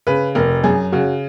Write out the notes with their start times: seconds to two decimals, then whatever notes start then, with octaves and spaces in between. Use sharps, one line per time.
0.07 C#3 B4
0.35 F1 A#4
0.64 F#2 G#4
0.92 C#3 F#4